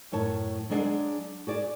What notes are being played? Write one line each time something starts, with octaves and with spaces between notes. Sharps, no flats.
F#2 A2 C#5 A5
F#3 G#3 D4 G#4 E5 F#5
F#4 G#4 D5